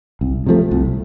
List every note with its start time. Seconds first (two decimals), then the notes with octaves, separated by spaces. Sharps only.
0.21 C2
0.46 C3 F3 A3
0.71 C2